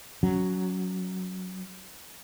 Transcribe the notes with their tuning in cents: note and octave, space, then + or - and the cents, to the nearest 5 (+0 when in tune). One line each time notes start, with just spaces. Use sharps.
F#3 +0 C#4 +15